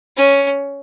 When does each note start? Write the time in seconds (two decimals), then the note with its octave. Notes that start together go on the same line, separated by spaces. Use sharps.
0.17 C#4